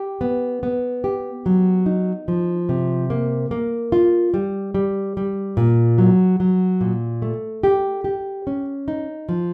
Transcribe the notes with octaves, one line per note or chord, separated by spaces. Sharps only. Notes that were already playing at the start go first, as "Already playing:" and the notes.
Already playing: G4
B3
B3
G4
F#3
D#4
F3
C3
A#3
A#3
F4
G3
G3
G3
A#2
F#3
F#3
A#2
A3
G4
G4
C#4
D#4
F3